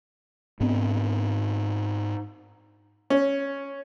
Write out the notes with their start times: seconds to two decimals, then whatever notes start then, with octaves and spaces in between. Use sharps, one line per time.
0.60 G#2 B3 C4 D4
3.10 C#4